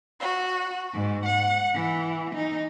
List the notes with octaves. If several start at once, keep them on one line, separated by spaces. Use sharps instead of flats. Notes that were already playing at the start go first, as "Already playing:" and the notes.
F#4
G#2
F#5
E3
D#4